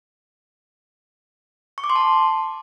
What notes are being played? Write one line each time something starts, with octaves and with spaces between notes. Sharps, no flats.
C#6
D6
C6
A5